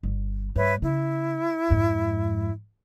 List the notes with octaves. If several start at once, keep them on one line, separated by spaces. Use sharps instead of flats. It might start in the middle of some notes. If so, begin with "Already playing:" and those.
G1
G2 B4 C#5 E5
C#3 E4
F2 G#2